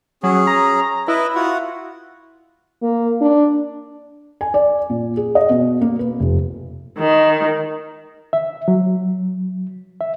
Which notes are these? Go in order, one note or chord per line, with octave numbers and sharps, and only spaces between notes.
F#3 C#4 G#4
A#5
E4 B4 D#5
F4 F#4 F#5
A#3
D4
G#5
D5
A#2
G#4
D#5
B2
A#3
B4
F1
D#3
E5
F#3
E5